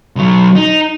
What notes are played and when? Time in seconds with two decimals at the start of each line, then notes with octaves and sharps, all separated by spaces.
0.16 B1 F#3
0.55 D#4